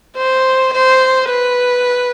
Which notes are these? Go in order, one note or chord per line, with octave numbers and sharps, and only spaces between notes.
C5
C5
B4